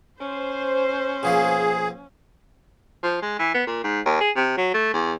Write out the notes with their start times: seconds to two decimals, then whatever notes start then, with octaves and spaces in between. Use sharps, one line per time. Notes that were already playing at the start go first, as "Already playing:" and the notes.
0.20 C#4 C5
1.23 B2 F3 A#3 G#4
3.03 F3
3.22 G#3
3.39 E3
3.54 B3
3.67 A#2
3.84 G#2
4.06 D#2
4.21 G#4
4.36 C3
4.57 F#3
4.74 A3
4.93 E2